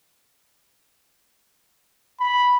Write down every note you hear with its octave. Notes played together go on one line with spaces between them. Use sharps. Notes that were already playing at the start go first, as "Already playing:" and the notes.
B5